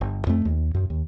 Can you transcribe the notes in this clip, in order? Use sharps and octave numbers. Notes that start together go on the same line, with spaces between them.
G1
F2 A3
D#2
F#2
D#2